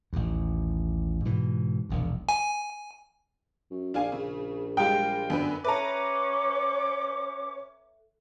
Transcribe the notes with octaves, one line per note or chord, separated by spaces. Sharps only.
A1 D#2
G#2 B2 E3
E1 A#1 D#2
G#5
F#2
A#1 D4 F5 G#5
C#3
G3 G#3 F4 G5
F#2 D3 B3 B4
C#4 A4 B4 C#5 E5 A#5 D6